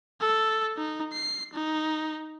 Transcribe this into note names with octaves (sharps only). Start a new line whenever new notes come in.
A4
D#4
C7
D#4